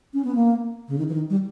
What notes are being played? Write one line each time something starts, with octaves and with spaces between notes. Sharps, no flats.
C#4
B3
A#3
C#3
D#3
E3
D#3
G3